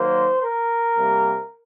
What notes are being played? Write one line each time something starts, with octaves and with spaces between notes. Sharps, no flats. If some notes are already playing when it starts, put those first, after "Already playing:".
Already playing: D#3 F#3 A#3 C5
A#4
C3 G3 A#3